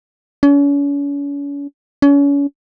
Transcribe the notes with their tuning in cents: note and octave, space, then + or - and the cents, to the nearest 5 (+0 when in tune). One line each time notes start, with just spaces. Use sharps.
C#4 +40
C#4 +35